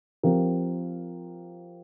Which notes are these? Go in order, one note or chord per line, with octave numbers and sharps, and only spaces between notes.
F3 C4 G4 A#4